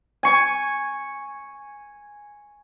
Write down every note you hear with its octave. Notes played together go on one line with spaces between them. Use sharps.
G#5 C#6